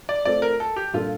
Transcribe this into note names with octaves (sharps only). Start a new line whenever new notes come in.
D5
A3 C4 F4 A4 D5
A#4
A4
G4
A#2 G3 D4 F4 A4